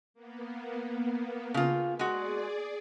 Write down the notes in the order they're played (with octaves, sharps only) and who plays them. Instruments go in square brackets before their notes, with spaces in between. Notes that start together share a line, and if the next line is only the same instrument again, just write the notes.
[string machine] A#3 B3
[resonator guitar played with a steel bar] C#3 F4
[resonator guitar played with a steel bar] G#3 F#4 [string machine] G#4 D5